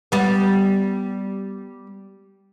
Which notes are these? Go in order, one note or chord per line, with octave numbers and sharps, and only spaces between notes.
G3 B3